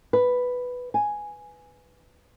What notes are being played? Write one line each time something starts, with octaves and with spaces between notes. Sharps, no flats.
B4
G#5